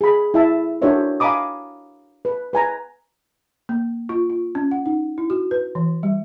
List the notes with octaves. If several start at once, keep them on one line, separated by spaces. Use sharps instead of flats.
G#4 B5
E4 E5 A5
D4 F#4 A#4 C5 C#5 E5
F5 G#5 A#5 B5 D6 D#6
B4
B4 G#5 A#5
A#3
F4
F4
C#4
F#5
D#4
E4
F#4
B4
E3
G3